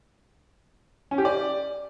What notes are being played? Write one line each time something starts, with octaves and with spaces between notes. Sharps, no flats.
C#4
G4
D5